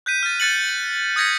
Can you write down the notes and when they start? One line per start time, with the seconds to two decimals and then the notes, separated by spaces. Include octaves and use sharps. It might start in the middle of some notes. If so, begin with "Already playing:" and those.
0.06 F#6 G6 B6 D#7
0.23 F6 A6
0.40 F#6 A6 C#7 F#7
0.69 F#7
1.16 D#6 G6 G#6 A#6 B6 C#7